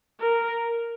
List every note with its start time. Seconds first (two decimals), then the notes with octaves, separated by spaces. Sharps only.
0.20 A#4